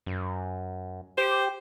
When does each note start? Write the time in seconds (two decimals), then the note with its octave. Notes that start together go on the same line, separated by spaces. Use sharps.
0.06 F#2
1.18 G4 C5